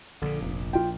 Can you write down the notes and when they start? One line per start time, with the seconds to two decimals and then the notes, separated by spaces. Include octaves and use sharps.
0.22 A#1 A#2 D3
0.42 F1
0.73 F4 G5